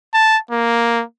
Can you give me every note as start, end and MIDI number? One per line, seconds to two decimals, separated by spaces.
0.14 0.37 81
0.51 1.03 58